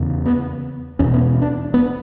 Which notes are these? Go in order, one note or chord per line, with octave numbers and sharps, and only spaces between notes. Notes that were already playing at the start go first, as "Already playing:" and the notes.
Already playing: E2 C#3
B3
E2 B2 C#4
B3
D4
B3